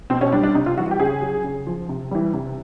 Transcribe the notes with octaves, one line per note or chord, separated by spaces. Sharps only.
B2 C4
C#4
G3 D4
D4
C3 D#4
F4
E3 G3 F#4
G4
C#3 G#4
F#3
C#3
F3
C3
E3 G3
C3